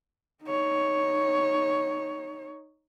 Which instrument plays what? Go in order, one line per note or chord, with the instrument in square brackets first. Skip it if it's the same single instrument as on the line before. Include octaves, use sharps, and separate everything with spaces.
[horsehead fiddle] D#4 C#5